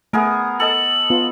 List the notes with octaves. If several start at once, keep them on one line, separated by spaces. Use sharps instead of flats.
A3 B3 G#4 A#4
A4 D#5 A5 F#7
B3 F4